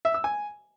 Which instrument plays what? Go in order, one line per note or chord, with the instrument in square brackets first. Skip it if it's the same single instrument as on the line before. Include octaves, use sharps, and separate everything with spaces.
[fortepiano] E5
E6
G#5